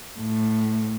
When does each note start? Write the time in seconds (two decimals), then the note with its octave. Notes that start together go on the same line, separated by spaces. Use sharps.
0.19 A2